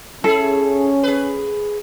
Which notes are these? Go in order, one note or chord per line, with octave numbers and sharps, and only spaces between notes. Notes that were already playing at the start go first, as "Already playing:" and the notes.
C#4 E4 G#4 A4
G#4 B4